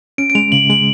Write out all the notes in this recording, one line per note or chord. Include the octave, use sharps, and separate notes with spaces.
C#4 D7
D7
G#3 F7
C#3 F#7
G#3 F#7